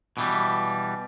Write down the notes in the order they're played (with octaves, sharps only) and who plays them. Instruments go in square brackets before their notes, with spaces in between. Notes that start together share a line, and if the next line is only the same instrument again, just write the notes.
[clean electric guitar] B2 E3 G3